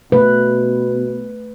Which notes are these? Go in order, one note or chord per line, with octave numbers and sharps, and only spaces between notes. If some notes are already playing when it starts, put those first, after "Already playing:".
B2 A3 B4